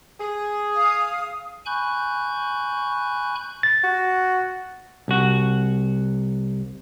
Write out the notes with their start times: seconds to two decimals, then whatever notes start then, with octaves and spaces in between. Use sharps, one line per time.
0.20 G#4
0.75 F5 D#6
1.66 G#5 B5 C#6 F#6 G6
3.63 A6
3.84 F#4
5.08 C2 F#4